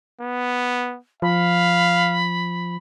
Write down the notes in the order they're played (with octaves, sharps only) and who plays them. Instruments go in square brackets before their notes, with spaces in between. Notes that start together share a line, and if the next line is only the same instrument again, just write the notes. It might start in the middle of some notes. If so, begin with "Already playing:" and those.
[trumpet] B3
[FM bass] F3 [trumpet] F5 [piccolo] B5